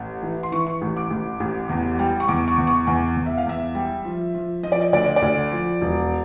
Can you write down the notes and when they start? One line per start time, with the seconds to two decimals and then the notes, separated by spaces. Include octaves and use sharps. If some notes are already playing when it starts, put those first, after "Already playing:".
Already playing: A1
0.22 E3
0.43 C6
0.52 E3 C#6
0.67 C#6
0.82 A1
0.97 D6
1.10 A1
1.40 A1
1.69 E2
1.99 G3
2.20 C#6
2.28 E2 D6
2.48 C#6
2.58 E2
2.67 C#6
2.87 E2 G#5
3.17 E2
3.26 E5
3.38 F5
3.46 E2 E5
3.75 G3
4.05 F3
4.34 F3
4.63 F3 D#5
4.72 D5
4.81 D#5
4.93 D2 D5
5.04 D#5
5.16 D5
5.22 D2
5.52 F3
5.81 E1